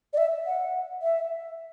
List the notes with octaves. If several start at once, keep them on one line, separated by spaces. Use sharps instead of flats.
D5
E5
F#5
E5